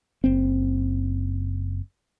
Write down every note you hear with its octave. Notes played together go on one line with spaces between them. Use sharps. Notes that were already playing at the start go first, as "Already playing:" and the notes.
F#1 C4